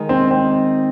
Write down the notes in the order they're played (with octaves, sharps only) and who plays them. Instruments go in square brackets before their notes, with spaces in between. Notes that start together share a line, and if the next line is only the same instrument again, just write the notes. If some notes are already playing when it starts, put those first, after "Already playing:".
Already playing: [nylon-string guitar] D#3 G#3 D#4
[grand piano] C4
C4